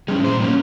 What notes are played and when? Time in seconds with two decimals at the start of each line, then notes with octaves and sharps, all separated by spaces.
0.08 G3 C#4 G#4
0.24 A#2 C5
0.40 G3 A#3 C#4